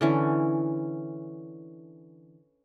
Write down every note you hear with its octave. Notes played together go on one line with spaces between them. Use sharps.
D3 E3 C#4